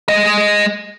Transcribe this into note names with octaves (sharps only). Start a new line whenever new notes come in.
G#3 D#5